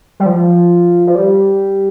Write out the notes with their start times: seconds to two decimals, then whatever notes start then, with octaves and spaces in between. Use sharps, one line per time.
0.20 G3
0.26 F3
1.07 F3
1.15 G3